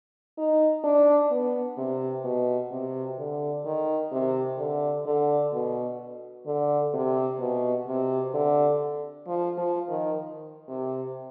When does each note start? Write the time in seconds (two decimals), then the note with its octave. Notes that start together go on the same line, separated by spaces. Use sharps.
0.38 D#4
0.84 D4
1.31 B3
1.78 C3
2.24 B2
2.71 C3
3.18 D3
3.65 D#3
4.12 C3
4.58 D3
5.06 D3
5.53 B2
6.46 D3
6.94 C3
7.40 B2
7.87 C3
8.34 D3
9.27 F3
9.58 F3
9.89 D#3
10.68 C3